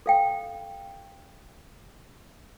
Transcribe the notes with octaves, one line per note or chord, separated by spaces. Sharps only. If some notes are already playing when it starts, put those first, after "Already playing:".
A4 F5 G5